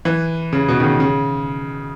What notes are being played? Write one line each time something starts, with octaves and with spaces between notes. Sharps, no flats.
E3
C#3
B2
D#3
C#3
C#3